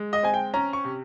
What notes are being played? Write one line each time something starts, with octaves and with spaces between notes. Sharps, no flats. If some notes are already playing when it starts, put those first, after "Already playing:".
Already playing: G#3
D#5
C4 G#5
G5
C#4 A#5
C#6
C3